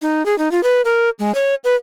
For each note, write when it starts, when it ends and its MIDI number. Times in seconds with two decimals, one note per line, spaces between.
0.02 0.25 63
0.26 0.37 68
0.38 0.51 63
0.51 0.63 65
0.63 0.81 71
0.85 1.09 70
1.19 1.34 56
1.35 1.55 73
1.64 1.75 71